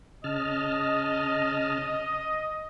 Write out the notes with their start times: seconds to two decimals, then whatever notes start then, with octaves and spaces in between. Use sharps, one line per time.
0.24 C#3 D#5 A5 F6